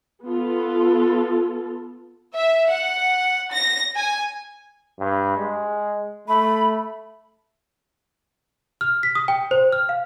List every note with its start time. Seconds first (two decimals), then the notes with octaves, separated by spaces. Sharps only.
0.24 B3 F4 A4
2.34 E5
2.68 F#5
3.52 A#6
3.96 G#5
4.99 G2
5.38 G#3
6.28 A3 B5
8.81 F6
9.03 B6
9.15 D#6
9.28 G5
9.51 C5
9.72 F6
9.89 F5